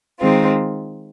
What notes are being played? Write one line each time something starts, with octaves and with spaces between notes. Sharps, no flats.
D#3 G#3 C4 F4